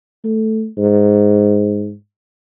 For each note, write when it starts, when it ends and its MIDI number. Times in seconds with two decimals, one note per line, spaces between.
0.25 0.67 57
0.78 1.94 44